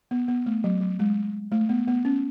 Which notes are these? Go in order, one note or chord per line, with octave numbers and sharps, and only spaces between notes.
B3
B3
A3
F#3
F#3
G#3
A3
B3
B3
C#4